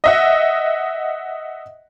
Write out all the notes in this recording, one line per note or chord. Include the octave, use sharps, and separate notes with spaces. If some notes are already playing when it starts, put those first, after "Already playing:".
D#5 E5 F#5